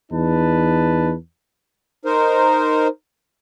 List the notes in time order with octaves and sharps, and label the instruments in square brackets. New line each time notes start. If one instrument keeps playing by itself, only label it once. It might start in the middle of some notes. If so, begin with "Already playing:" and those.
[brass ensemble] E2 D#4 B4 A5
[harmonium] D#4 A#4 C5